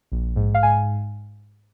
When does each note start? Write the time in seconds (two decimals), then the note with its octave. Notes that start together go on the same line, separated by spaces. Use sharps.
0.12 A#1
0.36 G#2
0.54 F5
0.63 G#2 G#5